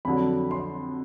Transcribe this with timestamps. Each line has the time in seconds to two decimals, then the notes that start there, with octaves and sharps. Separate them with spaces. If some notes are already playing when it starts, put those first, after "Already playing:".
0.05 F2 D3 F#3 B5
0.51 C6